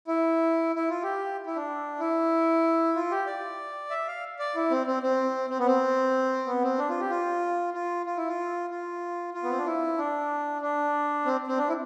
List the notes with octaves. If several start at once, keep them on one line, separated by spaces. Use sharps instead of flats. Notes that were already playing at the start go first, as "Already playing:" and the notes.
E4
E4
F4
G4
E4
D4
E4
F4
G4
D5
E5
F5
D5
E4
C4
C4
C4
C4
B3
C4
B3
C4
D4
F4
G4
F4
F4
F4
E4
F4
F4
F4
B3
C4
D4
E4
D4
D4
C4
C4
D4
E4